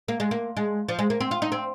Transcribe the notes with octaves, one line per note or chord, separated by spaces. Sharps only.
A#3
G#3
A#3
G#3
F3
G#3
A#3
C4
F4
D#4
C4